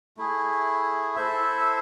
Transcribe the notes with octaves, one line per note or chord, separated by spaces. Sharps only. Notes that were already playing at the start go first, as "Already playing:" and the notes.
A3 E4 G#4
E4 A4 C5 E5